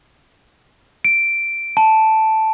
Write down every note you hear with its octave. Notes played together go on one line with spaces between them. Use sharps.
D7
A5